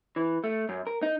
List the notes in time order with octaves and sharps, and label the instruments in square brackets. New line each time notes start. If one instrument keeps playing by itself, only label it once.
[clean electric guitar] E3
A3
F#2
A#4
D#4